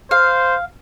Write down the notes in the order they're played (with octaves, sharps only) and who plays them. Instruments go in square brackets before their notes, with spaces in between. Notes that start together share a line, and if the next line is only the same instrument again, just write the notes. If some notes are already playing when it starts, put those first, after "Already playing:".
[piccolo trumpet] C5 [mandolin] F5